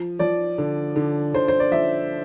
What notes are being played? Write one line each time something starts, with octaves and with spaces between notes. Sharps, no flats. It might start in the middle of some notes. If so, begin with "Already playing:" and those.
Already playing: F3
F3 D5
D3
D3
D3 C5
C5
D5
F3 E5